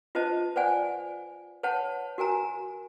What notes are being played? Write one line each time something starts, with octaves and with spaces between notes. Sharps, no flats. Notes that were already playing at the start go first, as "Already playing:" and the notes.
F4 B4 C5 D#5 A5
B4 C5 D5 F#5 G#5
B4 C#5 F#5 A5
F#4 A#4 G#5 A#5